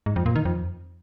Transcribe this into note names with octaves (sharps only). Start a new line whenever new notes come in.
G#2
F2
A#2
D#3
F2